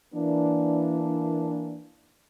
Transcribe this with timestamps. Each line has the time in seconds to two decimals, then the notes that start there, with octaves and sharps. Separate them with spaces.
0.15 E3 A#3 D4